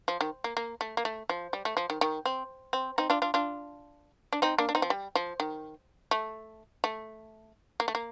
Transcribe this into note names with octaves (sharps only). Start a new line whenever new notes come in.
F3
D#3
A#3
A#3
A3
A#3
A3
F3
G3
A3
F3
D#3
D#3
C4
C4
C4 D#4
D4 F4
D4 F4
D4 F4
D4
C4 D#4
A#3 D4
D4
C4 D#4
F3
G3
F3
D#3
A3
A3
A#3
A3
A#3